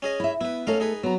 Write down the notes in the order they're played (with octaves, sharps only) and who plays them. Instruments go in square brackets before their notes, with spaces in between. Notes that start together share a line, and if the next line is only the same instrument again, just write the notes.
[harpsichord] C#4 G#4 D#5
[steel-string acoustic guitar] E4 E5
[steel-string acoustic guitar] B3 [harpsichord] E4 B4
[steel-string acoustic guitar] A3 A4 [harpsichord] C#4 D#4 F5
[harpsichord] D#4 G#4 B4
[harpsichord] F#3 [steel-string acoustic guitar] B3 A#5